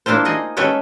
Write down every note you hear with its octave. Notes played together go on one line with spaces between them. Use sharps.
A#3 D4 E4 F4 C5
D#4 G#4 D#5
G#3 C#4 A4 B4 C#5 G5